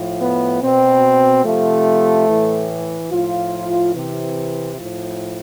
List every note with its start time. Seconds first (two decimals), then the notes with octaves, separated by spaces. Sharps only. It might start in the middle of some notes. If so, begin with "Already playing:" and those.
Already playing: A2 F3
0.19 B3
0.61 B2 C4
1.43 C3 F3 A3
2.26 A2 E3
3.09 A2 F3 F4
3.93 C3 E3
4.76 A2 F3